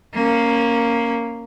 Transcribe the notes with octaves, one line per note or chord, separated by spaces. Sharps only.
A#3 C#4